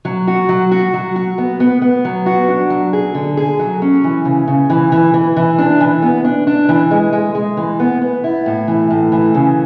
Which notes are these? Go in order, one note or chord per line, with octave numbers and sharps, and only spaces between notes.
F#3
F#4
F#3
F#4
F#3
F#4
B3
B3
B3
F#3
F#4
D4
F#3
G#4
D3
G#4
F#3
C#4
E3
C#3
C#3
E3
E3
E3
E3
D4
E3
B3
D4
D4
E3
G#3
G#3
G#3
E3
B3
B3
E4
A2
E3
A2
E3
C#3